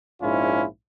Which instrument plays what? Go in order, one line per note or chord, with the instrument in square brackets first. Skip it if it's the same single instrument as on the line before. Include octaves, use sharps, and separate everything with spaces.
[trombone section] A#1 G#2 C#4 E4 F4